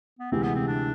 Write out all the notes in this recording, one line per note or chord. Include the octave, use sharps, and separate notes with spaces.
B3
D2 C3 E3 G#3 C4
B3
C4
D4